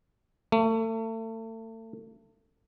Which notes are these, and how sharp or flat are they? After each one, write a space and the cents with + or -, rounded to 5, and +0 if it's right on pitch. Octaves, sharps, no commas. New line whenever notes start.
A3 +35